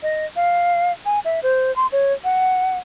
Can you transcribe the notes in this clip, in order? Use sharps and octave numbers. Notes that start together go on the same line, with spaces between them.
D#5
F5
G#5
E5
C5
C6
C#5
F#5